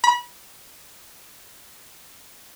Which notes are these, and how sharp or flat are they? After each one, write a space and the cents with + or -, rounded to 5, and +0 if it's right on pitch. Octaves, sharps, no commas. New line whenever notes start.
B5 -30